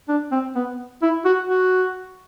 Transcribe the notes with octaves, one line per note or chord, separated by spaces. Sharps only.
D4
C4
B3
E4
F#4
F#4